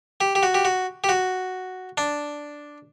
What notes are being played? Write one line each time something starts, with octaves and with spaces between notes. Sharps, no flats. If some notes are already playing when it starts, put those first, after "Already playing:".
G4
G4
F#4
G4
F#4
G4
F#4
D4